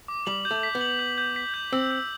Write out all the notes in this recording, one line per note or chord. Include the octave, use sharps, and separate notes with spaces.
D6
G3 F#7
G6
A3
B6
B3
F#7
G6
G6
B6
G6
C4 E6
E6